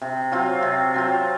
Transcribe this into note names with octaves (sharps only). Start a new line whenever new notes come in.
C3
F#3 C4 F4
C3
F#3 C4 F4